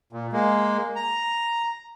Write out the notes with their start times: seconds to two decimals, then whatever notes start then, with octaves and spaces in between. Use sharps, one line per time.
0.13 A#2
0.33 G#3 A#3
0.96 A#5